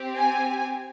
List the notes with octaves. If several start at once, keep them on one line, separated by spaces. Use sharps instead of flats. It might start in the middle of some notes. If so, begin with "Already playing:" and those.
Already playing: C4 G4
G#5